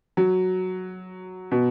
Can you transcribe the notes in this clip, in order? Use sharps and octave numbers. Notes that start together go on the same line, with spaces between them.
F#3
B2